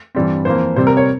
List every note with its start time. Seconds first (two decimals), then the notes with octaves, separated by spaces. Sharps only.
0.15 G2 E3 G3 C4
0.45 F2 E3 A#3 C5
0.76 C3 G3 C4 C5
0.87 A#4
0.97 C#5